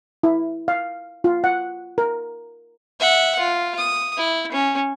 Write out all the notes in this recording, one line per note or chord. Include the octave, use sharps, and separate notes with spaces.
E4
F5
F4
F#5
A#4
E5 F#5
F4
D#6
E4
C#4